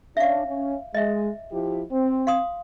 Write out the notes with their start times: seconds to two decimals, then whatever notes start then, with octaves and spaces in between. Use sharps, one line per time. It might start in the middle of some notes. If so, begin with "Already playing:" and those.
0.17 C#4 D4 E5 F5
0.46 C#4
0.94 G#3 D#5 E5
1.51 F3 E4 G4
1.91 C4
2.27 F5 C6 D#6